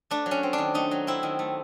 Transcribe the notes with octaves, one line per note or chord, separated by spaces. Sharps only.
A3 D4
F#3
C#4
C4
D4
D#3
A3 D#4
F#3
C4 E4
D#3
A3